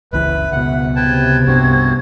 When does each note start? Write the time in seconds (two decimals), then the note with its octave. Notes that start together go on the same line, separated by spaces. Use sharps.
0.13 F#1 C#2 E3 B4 E5
0.52 C#2 B2 F#5
0.96 C3 B4 G5 A5 G#6
1.47 C2 G2 B3 C4 F#4